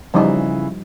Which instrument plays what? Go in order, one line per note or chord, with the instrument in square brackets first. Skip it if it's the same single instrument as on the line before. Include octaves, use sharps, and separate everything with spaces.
[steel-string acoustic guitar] C#3 E3 [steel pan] F3 G3 D#4